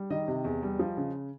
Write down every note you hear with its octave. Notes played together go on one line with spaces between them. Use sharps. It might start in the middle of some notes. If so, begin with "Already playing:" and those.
Already playing: G3
D#3 D#5
C3
E2
G3
F3
C#3